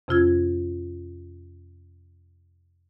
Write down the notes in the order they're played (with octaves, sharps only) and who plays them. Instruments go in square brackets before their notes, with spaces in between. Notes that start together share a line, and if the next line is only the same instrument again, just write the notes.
[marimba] F2 C3 C#4 F4 E6 G#6